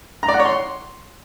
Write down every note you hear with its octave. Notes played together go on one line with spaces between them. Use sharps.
A#5
D5
F#5
C#5
C6